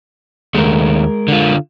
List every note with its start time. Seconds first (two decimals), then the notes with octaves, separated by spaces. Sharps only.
0.55 D#2 G#3 A3 A#4
1.28 D3 F4